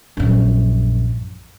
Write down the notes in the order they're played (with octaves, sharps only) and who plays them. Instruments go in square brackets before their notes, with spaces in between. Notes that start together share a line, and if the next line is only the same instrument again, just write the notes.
[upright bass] A#1 F#2